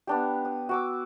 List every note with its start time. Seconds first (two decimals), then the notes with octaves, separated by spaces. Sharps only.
0.07 B3 D4 G4
0.45 D#6
0.69 F#4 D6 E6